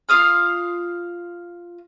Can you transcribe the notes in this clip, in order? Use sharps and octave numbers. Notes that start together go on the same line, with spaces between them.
F4 F5 D#6 F6